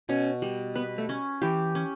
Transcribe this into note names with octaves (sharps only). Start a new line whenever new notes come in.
B2 C#4
G3
B3 B4
A3
C#4
E3 G4
C#4